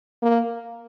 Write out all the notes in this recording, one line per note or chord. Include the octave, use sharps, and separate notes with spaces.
A#3